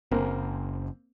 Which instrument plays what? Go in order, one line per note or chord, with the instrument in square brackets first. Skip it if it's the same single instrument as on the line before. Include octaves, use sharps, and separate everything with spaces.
[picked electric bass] F#1 [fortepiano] A#3 C4